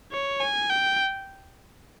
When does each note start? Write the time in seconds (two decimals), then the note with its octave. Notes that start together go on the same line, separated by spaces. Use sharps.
0.12 C#5
0.41 G#5
0.70 G5